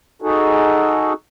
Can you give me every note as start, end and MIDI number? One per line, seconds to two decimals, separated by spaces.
0.22 1.13 63
0.22 1.13 66
0.22 1.13 68
0.22 1.13 69